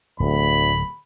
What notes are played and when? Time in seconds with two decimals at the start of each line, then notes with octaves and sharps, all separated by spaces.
0.20 D1 D2 B5